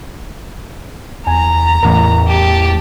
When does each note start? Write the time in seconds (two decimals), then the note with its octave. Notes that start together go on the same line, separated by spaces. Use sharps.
1.27 E2 G#5 A#5
1.83 A1 E2 A#4
2.27 G4 A5